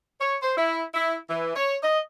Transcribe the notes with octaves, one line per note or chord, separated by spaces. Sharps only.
C#5
C5
E4
E4
E3
C#5
D#5